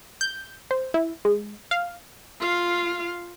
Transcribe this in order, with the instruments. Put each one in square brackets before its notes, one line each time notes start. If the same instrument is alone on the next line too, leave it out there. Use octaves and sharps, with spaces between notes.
[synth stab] G6
C5
E4
G#3
F5
[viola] F4 F5